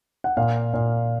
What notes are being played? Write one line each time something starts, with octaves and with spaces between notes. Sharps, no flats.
F#5
A#2 F5
A#2